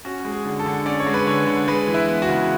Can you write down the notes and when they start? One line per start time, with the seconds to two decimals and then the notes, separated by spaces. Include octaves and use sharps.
0.05 C#4 F#4
0.25 G#3
0.32 G#4
0.45 D3
0.59 A4
0.66 D3
0.86 C#4 D5
1.00 C#5
1.07 G#3
1.14 B4
1.27 D3 C#5
1.47 D3
1.68 G#3 B4
1.88 E3
1.94 E4
2.07 B3
2.22 F#4
2.29 C#3